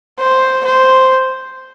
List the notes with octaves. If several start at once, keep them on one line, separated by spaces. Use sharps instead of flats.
C5
C5